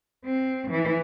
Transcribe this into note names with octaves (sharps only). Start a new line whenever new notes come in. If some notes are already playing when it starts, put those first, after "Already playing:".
C4
E3